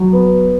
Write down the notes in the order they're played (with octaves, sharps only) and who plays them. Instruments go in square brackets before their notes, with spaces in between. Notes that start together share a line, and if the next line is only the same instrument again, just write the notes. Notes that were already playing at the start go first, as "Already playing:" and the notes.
Already playing: [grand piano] F#3
B3